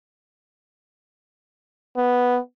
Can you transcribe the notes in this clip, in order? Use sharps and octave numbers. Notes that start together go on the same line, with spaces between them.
B3